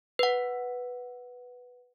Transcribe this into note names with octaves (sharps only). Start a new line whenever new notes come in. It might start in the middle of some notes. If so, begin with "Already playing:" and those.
B4 F#5